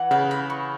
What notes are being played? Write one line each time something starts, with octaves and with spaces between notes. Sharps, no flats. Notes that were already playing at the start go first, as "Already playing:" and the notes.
Already playing: E3 F#5
C#3 B4
B5
C#6